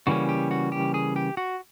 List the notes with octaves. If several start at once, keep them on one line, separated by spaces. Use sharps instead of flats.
C#3 E3 G3 A#3 C#4 F#4
G4
F#4
G4
G#4
G4
F#4